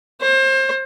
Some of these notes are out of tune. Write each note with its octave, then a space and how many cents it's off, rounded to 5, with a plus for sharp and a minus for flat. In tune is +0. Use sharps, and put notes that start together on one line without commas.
C5 +30